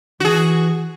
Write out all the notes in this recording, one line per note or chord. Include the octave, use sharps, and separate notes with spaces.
E3 F#4 G#4